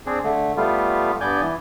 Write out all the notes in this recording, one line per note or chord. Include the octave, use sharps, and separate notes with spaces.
C4 D4 G#4
D3 A3
G3 A3 B3 F4
G2 B3 D5 G#5 G6
E3